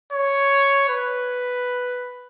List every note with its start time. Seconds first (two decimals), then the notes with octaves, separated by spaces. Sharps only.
0.12 C#5
0.89 B4